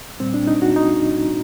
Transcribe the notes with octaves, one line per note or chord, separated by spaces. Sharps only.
A#2 G3 C4
D4
D#4
F#4
D#4